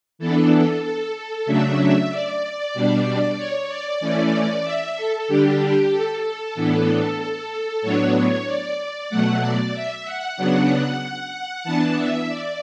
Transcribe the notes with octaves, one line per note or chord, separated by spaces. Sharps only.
E3 B3 D4 A4
A4
A4
C#3 F#3 A3 D4 E5
D5
B2 G3 D4
C#5
D5
E3 A3 C#4
E5
A4
D3 G3 D4 G4
A4
A2 E3 B3 D4
A2 F#3 B3 D4 C#5
C#5
D5
B2 F#3 A3 F#5
D5
E5
F#5
C#3 F#3 B3 D4
E3 B3 D4 A5
E5
D5